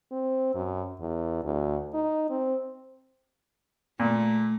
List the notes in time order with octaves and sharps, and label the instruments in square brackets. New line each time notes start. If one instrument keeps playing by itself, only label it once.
[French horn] C4
F#2
E2
D2
D#4
C4
[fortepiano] A#2 [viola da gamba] A3